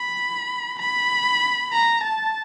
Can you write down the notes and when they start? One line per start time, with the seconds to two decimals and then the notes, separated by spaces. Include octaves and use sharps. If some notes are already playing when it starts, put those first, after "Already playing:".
Already playing: B5
0.79 B5
1.72 A#5
2.03 A5